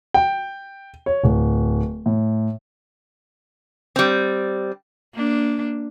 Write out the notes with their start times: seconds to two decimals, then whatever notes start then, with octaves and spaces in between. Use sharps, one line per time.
0.14 G5
1.06 C#5
1.23 D1
2.06 A2
3.96 G3 C4
5.14 A#3 D4